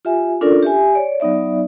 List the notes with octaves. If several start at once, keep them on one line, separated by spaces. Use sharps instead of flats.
F4 G4 E5 G#5
C#4 D4 F4 A4 A#4 D5
G4 E5 G#5
C#5 D5
F#3 B3 D#4 D5 E5